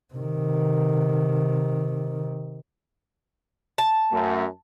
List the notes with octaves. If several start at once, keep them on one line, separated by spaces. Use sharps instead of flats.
C3 D#3
A5
F#2 A3